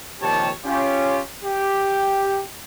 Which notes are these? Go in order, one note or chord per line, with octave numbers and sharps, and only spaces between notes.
A#1 C3 D#3 G4 C#5 A5
C#4 F4 G4
G4